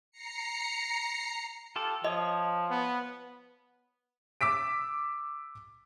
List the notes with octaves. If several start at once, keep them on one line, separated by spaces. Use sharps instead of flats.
A#5 C7 C#7
F4 G4 A4
F3 C#5 D#5 D#6
B3
D6 E6 B6 D7